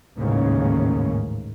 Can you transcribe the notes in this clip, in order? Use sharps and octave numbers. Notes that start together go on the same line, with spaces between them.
A1 D#2 G#2 C#3 A#3 C#4